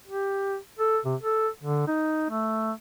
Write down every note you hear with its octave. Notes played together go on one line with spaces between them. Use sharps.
G4
A4
C3
A4
D3
D#4
A3